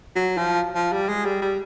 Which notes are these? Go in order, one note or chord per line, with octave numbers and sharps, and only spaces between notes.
F#3
F3
F3
G3
G#3
G3
G3